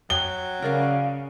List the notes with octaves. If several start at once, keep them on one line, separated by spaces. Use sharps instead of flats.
F#3 G5 G7
C#3 A#4 D5 F5